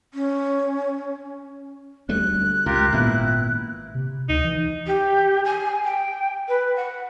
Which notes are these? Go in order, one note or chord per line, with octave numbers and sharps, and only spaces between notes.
C#4
D2 G3 A3 F#6
C#2 F4 G4 A#4
G#1 A#2 B3 E4
C3
D2 D#4
E3
G4
G#5
G5
B4
F#5